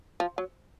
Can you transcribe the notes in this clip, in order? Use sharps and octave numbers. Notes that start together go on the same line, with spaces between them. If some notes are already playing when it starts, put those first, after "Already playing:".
F3
F#3